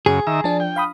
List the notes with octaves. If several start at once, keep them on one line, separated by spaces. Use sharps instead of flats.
F#2 C#3 G#4
D#3 E5 A#5
F3 D4 A5
G5
F5 B5 D#6